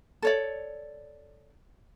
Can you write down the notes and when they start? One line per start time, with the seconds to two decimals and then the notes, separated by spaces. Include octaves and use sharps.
0.22 A4 C#5 D5